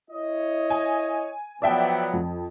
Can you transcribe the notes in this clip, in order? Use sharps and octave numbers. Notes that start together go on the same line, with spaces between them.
E4 C#5 D#5
G#5
F3 F#3 B3 D5 E5 G5
F2